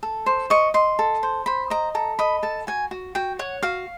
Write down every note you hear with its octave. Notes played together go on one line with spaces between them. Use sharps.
A4
C5
D#5 C#6
D#5 C6
A4
C5
C5 B5
D#5 A#5
A4 A#5
D#5 B5
A4 A5
F#4 G#5
F#4
F#4 G5
C#5 F#5
F#4 F5